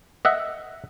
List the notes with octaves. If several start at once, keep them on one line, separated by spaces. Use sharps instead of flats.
D#5 E5 F#5